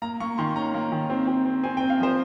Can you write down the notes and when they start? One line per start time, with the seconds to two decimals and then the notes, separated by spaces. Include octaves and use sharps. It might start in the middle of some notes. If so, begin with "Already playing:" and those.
0.02 A#3 A#5
0.20 A#3 C#6
0.38 D#3 C6
0.56 C#4 A#5
0.74 A#3
0.92 D#3
1.10 C4
1.27 C4
1.45 C4
1.64 C4 G#5
1.77 G5
1.81 C4
1.90 F5
2.00 F3 C5